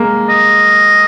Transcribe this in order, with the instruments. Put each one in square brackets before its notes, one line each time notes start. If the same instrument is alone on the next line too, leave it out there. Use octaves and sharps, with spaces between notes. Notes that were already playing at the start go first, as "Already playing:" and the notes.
Already playing: [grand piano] G#3 A#3
[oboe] D#5